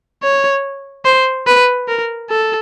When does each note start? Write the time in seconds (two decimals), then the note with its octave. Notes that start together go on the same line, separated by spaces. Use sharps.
0.23 C#5
1.05 C5
1.47 B4
1.88 A#4
2.30 A4